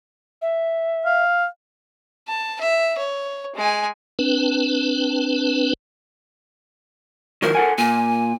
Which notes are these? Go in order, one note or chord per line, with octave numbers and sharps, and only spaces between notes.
E5
F5
A5
E5
C#5
G#3 G#5
C4 D4 B4
D#3 F3 F#3 A#4
A4 F#5 G#5
A#2 G#5